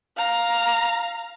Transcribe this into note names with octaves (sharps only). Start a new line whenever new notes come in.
F5 A#5